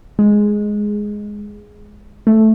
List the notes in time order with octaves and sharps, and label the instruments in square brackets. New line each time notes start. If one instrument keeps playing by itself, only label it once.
[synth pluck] G#3
A3